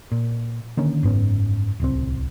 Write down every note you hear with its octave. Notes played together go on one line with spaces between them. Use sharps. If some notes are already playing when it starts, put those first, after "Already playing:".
A#2
D3 D#3 A#3 C#4
F#1 G#2 B3 C#4
D1 C2 C4